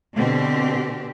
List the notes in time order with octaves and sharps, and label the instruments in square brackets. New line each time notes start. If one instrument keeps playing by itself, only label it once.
[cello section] B2 D3 C4 G4